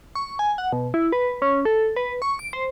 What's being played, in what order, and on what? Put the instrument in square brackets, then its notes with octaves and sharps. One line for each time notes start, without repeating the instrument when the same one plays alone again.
[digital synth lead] C#6
G#5
F#5
B2
E4
B4
C#4
A4
B4
C#6
D7
C5